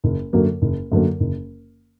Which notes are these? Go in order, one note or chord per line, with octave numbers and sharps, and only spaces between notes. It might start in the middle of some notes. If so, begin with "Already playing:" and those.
F#1
F#2 D3 F#3 A#3
F#1
F#2 D3 F#3 A#3
F#1